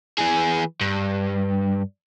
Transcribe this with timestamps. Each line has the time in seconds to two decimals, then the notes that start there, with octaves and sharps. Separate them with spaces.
0.18 E3 G#4
0.81 G2